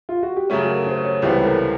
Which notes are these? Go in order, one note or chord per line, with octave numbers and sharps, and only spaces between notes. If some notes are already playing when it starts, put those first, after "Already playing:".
F4
F#4
G4
F#2 C#3 F#3 A3 C#4 G#4
A#4
C5
C#5
C#2 C3 E3 G3 B3 C5
A4
A#4